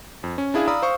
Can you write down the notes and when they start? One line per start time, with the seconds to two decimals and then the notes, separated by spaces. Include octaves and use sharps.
0.24 F2
0.38 C#4
0.54 D4 E4 G#4 F5
0.68 D5 F5 A#5 B5 D#6 E6
0.82 C5 F5 C#6 D#6